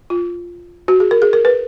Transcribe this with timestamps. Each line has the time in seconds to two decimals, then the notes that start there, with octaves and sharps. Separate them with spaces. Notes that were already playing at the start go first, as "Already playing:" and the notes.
0.10 F4
0.88 F#4
1.00 G#4
1.11 A#4
1.22 G#4
1.33 A#4
1.45 B4